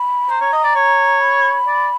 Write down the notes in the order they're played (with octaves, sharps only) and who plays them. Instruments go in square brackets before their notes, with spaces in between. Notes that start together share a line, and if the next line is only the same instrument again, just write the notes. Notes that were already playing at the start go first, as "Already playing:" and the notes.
Already playing: [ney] B5
[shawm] C5 [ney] A#5
[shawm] C#5
D#5
D5
C#5
[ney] B5
[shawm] D5